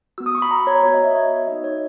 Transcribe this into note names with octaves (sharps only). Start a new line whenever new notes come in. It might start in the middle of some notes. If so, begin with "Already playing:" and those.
B3 F#4 E6
D#6
C#6
B5
A#5
C#5
B3 F#4 C#5
D#5
E5
C#5
B3 D#4 F#4 D#5
C#5